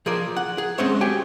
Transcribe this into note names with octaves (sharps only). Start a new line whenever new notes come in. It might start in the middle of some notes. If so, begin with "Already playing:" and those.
F3 G#4 A#4 D5
F#5
G#4
G#3 C4 C#4 C5 C#5 E5
F#4 G4 G5 G#5